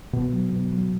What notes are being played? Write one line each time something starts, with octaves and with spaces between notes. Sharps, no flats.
B2
F#3
B2
F#3